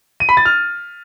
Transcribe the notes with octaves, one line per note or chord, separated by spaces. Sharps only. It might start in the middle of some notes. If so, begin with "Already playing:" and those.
D#7
B5
A6
F6